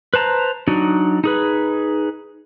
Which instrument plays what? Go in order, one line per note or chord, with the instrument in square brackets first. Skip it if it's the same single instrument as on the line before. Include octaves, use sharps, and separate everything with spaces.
[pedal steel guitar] B4 C5 A5 A#5
F#3 D4 D#4 F#4
D#4 G#4 B4